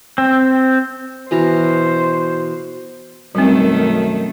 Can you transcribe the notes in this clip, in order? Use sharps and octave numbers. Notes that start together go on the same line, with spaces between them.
C4
B2 E3 C5 A#5
F#2 B2 D#3 G3 A3 C4